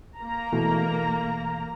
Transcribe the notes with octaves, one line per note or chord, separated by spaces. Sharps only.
A#3 A#5
B2 E3 A3